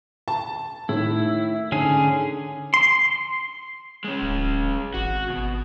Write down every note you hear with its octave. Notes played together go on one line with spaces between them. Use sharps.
A5
A2 D#3 E4
G#2 D3 C#4 G#4
C6
G#3 C#4
D1
G#1 F#4
B2